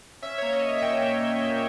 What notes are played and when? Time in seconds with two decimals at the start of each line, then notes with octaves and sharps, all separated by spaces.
0.22 C#4 E5
0.38 A#3 C#5
0.53 D#5
0.62 C#4
0.78 E5
0.82 A#2 G5
1.02 A#3
1.21 A#3
1.41 A#3